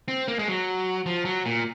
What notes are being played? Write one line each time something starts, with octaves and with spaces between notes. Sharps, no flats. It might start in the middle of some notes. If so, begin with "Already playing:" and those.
C4
A#3
G#3
F#3
F3
F#3
A#2